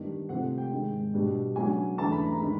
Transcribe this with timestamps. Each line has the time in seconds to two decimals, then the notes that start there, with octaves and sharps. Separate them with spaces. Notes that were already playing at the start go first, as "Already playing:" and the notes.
Already playing: G2 D#3 G3 B3 D4
0.29 C3 F3 A3 C4 F#5
0.58 G5
0.71 G#2 D#3 G#3
1.13 B2 G3 B3 D4
1.56 C#3 F#3 B3 D4 G#5
1.98 E2 C#3 E3 A3 D4 A5
2.12 B5
2.26 A#5
2.40 D#3 G#3 B5